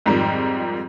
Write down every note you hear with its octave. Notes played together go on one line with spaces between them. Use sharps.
F2 G#2 D#3 F3 G3